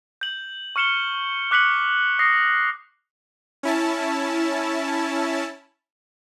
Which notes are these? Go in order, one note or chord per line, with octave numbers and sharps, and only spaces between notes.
G6 F#7
C#6 F6 C#7 E7 G7
D6 F#6 B6 C#7 F#7
D#6 A#6 C7
C#4 E4 A5